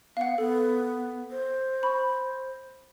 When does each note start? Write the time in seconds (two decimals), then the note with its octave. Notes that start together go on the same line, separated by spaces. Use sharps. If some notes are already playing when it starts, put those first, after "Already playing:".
0.17 B3 F5 F#5
0.38 B3 A4
1.31 C5
1.83 B5 C#6